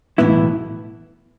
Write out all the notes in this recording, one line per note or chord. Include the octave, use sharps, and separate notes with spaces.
B1 A2 E3 B3 E4